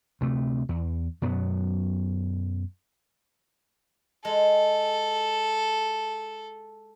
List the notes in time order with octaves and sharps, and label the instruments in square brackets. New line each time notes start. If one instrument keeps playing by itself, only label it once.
[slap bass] D2 C3 A3
E2
F#2 B2 F#3 B3
[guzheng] G#3 [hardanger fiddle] A4